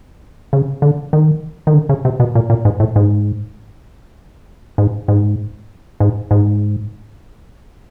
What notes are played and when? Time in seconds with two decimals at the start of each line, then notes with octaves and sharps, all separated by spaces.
0.53 C#3
0.82 D3
1.13 D#3
1.67 D#3
1.74 D3
1.89 C#3
2.05 C3
2.20 B2
2.35 A#2
2.50 A#2
2.65 G#2
2.80 A2
2.96 G#2
4.78 G#2
5.08 G#2
6.00 G#2
6.31 G#2